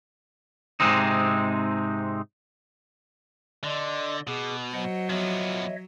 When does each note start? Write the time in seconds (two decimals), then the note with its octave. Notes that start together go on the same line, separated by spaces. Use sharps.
0.80 G#2 C3 G#3 C4 D#4
3.64 D3 D5 D#5 C6
4.27 B2 G#4 D6
4.73 F#3 C5 D#5 F#5
5.10 F3 B3 C#5 D#5 E5